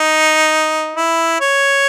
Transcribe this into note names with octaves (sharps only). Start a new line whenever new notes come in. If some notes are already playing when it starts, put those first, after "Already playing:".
Already playing: D#4
E4
C#5